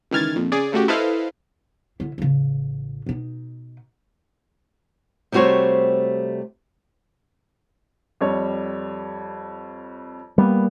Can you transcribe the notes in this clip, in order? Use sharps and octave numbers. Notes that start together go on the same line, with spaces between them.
C#2 D#3 E3 F6 G#6 A6
A#1 F2
C#3 G#4 D5
C#3 A3 F#4 G4
E4 A4 B4 C5 D#5 F5
D3 E4
A1 C#3
B2 D#4
C3 G3 A3 F#4 C5 C#5
F2 G3 C#5
G3 G#3 A#3 B3